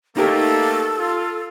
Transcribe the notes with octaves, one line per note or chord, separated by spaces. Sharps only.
A3 A#3 D#4 G4 A4 A#4
F4